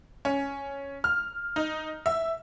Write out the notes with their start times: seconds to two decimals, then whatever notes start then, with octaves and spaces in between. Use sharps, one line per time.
0.25 C#4
1.04 F6
1.56 D#4
2.06 E5